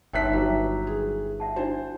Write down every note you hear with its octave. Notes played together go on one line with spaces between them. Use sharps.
G1 D#4 B4 C#5 E5 G5 F#6 B6
F#3 G4
G#4
E5 F#5 A5
D4 E4 F#4 C5